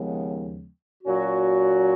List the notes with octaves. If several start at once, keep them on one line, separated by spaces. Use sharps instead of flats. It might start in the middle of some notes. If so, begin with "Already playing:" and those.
Already playing: D#2 C#3 F3 G#3 B3
A#2 F#3 C#4 F#4